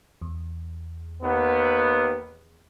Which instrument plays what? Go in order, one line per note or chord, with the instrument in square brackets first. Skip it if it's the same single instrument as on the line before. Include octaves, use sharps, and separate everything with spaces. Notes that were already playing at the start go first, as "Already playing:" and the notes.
[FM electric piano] E2
[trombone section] D#2 B3